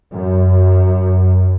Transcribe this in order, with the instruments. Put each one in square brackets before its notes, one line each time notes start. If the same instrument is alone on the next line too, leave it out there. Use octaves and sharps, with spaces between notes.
[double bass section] F#2